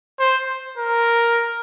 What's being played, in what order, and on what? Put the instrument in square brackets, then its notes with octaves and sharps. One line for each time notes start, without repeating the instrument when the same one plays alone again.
[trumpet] C5
A#4